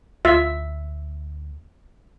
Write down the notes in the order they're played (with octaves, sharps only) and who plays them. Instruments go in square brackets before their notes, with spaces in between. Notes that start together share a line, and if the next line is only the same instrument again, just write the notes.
[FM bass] D2 [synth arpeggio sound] F4 [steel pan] E5